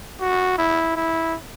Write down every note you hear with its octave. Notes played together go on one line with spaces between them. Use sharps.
F#4
E4
E4